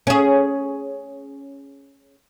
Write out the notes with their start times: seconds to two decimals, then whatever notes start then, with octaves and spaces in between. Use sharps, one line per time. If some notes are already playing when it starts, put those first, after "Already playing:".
0.07 C#4 G#4